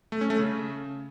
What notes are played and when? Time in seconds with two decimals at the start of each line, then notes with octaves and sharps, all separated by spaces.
0.12 A3
0.21 C#4
0.30 A3
0.39 C#3